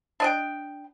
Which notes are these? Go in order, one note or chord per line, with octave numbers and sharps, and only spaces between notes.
D4 D#5 G5